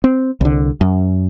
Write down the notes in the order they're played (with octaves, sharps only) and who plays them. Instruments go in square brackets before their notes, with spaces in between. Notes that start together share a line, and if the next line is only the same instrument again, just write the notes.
[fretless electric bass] C4
C2 D3
F#2